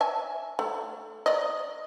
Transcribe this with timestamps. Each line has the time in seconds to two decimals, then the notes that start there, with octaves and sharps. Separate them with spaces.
0.01 E5 G#5 A5
0.59 A3
1.26 D5 D#5